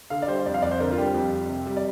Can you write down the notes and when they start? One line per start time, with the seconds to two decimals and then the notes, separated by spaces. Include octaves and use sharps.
0.10 D3 F5
0.22 D5
0.28 G3 C5
0.46 F2 D5
0.54 F5
0.62 F2 D5
0.71 C5
0.80 D3 A#4
0.92 F4
0.98 G3 G4
1.14 F2
1.33 F2
1.49 C3
1.67 G3
1.77 D5